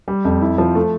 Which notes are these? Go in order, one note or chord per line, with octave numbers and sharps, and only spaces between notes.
G3
F2
E4
F3
A3